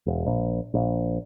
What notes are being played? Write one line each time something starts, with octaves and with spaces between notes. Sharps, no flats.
E1
A#1
A#1